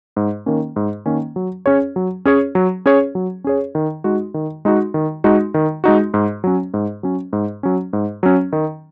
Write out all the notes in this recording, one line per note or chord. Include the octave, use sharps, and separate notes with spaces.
G#2
D#3 A#3 C#4
G#2
D#3 A#3 C#4
F#3
C#4 G#4 C#5
F#3
C#4 G#4 C#5
F#3
C#4 G#4 C#5
F#3
C#4 G#4 C#5
D#3
G#3 D#4 F#4
D#3
G#3 D#4 F#4
D#3
G#3 D#4 F#4
D#3
G#3 D#4 F#4
G#2
F#3 C#4
G#2
F#3 C#4
G#2
F#3 C#4
G#2
F#3 C#4
D#3